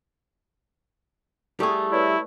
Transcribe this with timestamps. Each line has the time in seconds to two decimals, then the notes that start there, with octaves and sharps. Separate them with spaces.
1.60 G3 A3 E4 G#4 A4 C#6
1.92 E4 B4 C#5 D5